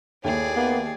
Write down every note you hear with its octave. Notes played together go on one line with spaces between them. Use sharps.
D#2 A2 G#4 D5 E5 G5
A#3 B3